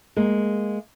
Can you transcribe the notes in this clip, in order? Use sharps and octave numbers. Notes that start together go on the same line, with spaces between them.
G#3 A#3